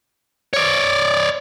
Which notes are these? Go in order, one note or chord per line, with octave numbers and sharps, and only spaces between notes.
C#5 D5